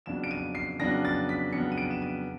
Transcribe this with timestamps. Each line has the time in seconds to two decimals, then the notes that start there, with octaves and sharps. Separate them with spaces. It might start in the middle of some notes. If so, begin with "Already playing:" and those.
0.06 F2 C#3 F#3 B3 D4 E7
0.24 D7
0.31 D#7
0.55 C7
0.79 F2 C#3 F#3 B3 D4 A#6
1.05 A6
1.29 B6
1.53 F2 C#3 F#3 B3 D4 C#7
1.72 D#7
1.78 D7
1.91 E7
2.02 D#7